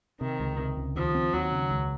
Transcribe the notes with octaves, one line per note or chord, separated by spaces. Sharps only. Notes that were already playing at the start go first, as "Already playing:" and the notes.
C3 D#3
C#2
C3
C#2
D#2 F3
C4
D#2 F#3
C#3
C#2